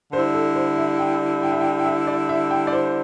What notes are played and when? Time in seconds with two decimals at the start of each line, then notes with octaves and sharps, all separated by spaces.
0.13 D3 G3 E4 C5
0.34 A4
0.55 C5
0.77 E5
0.99 G5
1.43 G5
1.52 E5
1.61 G5
1.79 G5
1.86 E5
2.07 D5
2.29 E5
2.51 G5
2.67 D5
2.72 C5